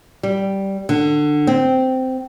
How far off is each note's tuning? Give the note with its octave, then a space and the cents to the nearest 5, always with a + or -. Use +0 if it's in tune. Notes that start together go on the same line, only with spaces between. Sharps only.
G3 -10
D3 +20
C4 -10